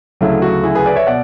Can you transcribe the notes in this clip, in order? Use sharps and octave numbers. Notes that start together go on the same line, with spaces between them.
D2 C#3 F#3 A3 E4
F#4
E4 G#4
G#4 B4
B4 D5
C#5 E5
B2 D5 F#5